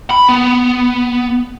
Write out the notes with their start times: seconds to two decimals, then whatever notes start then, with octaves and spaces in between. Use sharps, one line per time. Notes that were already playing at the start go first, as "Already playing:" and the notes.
0.11 B5
0.29 B3